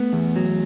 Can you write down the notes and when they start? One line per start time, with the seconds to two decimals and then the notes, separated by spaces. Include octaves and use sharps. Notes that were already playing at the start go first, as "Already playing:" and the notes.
Already playing: A3 B3
0.13 E2
0.36 F#3